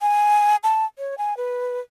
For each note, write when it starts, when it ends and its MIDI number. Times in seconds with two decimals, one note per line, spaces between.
0.01 0.56 80
0.63 0.85 81
0.98 1.15 73
1.18 1.36 80
1.37 1.80 71